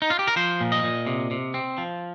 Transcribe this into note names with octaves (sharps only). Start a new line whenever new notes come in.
D#4
F4
G4
A#4
F3 C5
A#2
D#5
A#2
C3
C3
C4
F3